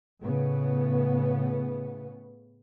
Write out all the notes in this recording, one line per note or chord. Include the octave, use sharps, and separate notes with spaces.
A2 C#3 B3